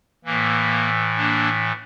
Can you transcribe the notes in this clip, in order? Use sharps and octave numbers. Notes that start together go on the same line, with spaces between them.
A2 E3 A#3
A#3 D4